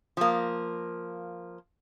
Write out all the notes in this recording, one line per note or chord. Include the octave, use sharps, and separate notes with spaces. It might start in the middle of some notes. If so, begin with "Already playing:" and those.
F3 A#3